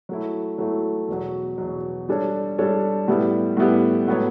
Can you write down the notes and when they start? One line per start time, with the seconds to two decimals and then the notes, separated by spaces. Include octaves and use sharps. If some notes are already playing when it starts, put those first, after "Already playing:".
0.09 F#3 A3 E4
0.58 F#3 A3 E4
1.08 E2 B2 F#3
1.58 E2 B2 F#3
2.09 G3 D4 A4 C#5
2.59 G3 D4 A4 C#5
3.08 A2 G3 B3 E4 G4
3.57 A2 G3 B3 E4 G4
4.08 A2 F#3 B3 F#4 C#5